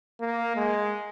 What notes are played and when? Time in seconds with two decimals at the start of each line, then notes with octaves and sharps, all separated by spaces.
0.21 A#3
0.56 G#3